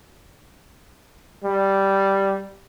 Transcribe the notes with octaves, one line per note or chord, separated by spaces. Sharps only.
G3